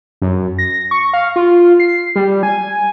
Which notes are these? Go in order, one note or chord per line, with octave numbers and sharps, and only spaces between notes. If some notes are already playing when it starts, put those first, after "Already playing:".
F#2
A#6
C#6
F5
F4
C7
G3
G#5